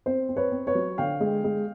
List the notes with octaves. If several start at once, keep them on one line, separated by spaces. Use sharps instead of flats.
C4 C5
C4
B4 C#5
C4
B4 C#5
F#3
D3 F5 G5
G#3
G#3